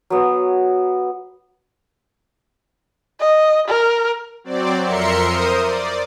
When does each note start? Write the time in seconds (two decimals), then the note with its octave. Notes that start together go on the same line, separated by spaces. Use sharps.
0.10 F#3 B3
3.20 D#5
3.68 A#4
4.44 F#3 C4 D5
4.83 F2 A#4 E5 C6 C#7
5.26 A#4 C5 D#6
5.62 D5